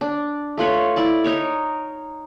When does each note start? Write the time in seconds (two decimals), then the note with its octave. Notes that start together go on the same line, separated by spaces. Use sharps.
0.01 D4
0.57 A3 F4 B4 C#5
0.96 E4 D5 A5
1.24 D#4 A#4 C#5